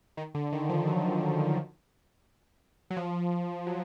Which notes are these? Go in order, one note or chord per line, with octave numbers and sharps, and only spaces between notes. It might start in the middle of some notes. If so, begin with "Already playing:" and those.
D#3
D3
D#3
F3
F#3
F#3
F3
F#3